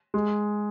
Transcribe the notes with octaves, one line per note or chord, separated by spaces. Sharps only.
G#3